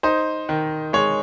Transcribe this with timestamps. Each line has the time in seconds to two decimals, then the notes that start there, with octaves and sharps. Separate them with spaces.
0.03 D#4 C5
0.49 D#3
0.93 G#3 C#5